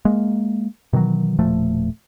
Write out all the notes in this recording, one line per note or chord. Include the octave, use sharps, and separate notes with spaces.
G#3 A#3
B2 D#3 E3 F#3
E1 A#2 F3 A3